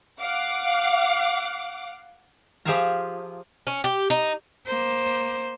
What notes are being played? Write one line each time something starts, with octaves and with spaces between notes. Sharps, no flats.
F5 F#5 D6
F3 G4 G#4 E5 F5 A#5
C#4
G4
D#4
A#3 C5